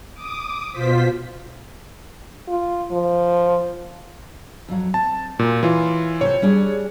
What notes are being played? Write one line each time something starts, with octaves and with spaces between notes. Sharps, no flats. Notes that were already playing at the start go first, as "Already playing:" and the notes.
D6 D#6
B2 F4 C5 B6
F4
F3
F2 F#3
C4 A5
A#2 F#4
E3 F4 C#5
C3 A4 C5 C#5
G3 D4 G#4